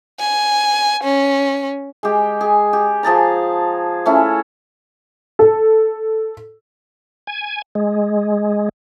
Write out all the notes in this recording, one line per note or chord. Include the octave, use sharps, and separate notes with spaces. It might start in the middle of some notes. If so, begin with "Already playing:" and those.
G#5
C#4
G#3 G4
G#4
G4
F3 G#4 A5 A#5
A3 C#4 E4
A4
G#5
G#3